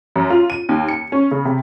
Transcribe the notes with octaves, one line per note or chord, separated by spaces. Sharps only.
F#2
F4
D#7
D#2
C#7
C#4
C#3
C3